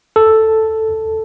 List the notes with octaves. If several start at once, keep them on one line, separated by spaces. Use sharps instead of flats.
A4